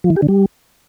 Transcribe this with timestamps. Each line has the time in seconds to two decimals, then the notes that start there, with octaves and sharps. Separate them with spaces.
0.04 F3
0.10 E3
0.16 G4
0.22 D3
0.28 G3